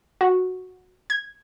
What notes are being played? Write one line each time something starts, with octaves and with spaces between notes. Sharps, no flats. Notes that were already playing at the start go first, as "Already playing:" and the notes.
F#4
G#6